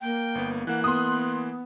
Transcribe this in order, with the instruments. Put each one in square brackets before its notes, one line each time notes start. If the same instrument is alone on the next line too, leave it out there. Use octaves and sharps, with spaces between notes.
[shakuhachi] A#3 [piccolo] G5
[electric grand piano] G1 B3
[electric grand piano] E3 A#3 [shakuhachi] F#5 [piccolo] F#6
[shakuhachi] B3 [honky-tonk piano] C6 D#6